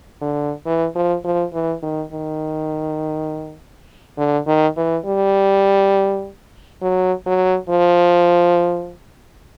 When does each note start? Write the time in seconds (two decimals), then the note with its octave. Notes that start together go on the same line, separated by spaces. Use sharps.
0.22 D3
0.66 E3
0.95 F3
1.24 F3
1.53 E3
1.83 D#3
2.13 D#3
4.18 D3
4.47 D#3
4.77 E3
5.06 G3
6.82 F#3
7.26 F#3
7.70 F3